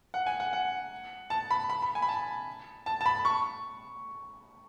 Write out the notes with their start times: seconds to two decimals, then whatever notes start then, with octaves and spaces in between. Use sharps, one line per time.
0.14 F#5
0.27 G#5
0.40 F#5
0.53 F#5
1.30 A5
1.51 B5
1.70 B5
1.82 B5
1.95 G#5
2.02 B5
2.09 A5
2.86 A5
3.01 A5
3.06 B5
3.25 C#6